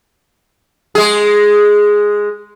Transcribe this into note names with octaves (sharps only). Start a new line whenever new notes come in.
G#3 G#4